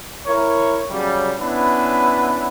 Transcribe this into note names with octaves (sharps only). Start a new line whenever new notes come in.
E4 A#4 C#5
C#3 F#3 G3
B3 C#4 D4 E4 B4